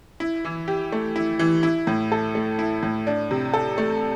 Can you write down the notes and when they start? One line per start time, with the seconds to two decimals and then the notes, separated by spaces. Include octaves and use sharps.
0.20 E4
0.45 E3
0.68 G4
0.92 A3
1.16 E4
1.39 E3
1.63 E4
1.87 A2
2.12 A4
2.35 A3
2.59 E4
2.83 A2
3.07 D4
3.31 C3
3.54 A4
3.78 A3